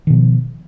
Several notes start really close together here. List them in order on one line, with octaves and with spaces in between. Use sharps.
D#3 B2 F3